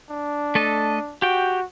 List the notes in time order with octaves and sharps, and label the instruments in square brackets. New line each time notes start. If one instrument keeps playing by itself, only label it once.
[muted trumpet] D4
[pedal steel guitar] A3 A4 D#5
[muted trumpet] F#4 [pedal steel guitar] G4 G5